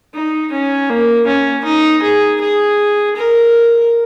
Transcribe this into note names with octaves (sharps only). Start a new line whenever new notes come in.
D#4
C#4
A#3
C#4
D#4
G#4
G#4
A#4